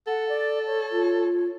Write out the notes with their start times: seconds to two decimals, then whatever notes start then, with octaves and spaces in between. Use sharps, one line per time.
0.07 A4 F#5
0.29 D5
0.67 C#5
0.92 F4